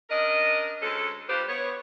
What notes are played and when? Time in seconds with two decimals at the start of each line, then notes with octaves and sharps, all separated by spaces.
0.10 C#4 D4 A#4 D#5
0.82 D2 G#3 C#4 A4
1.29 G3 D4 F4 G4 B4 C5
1.49 B3 C#5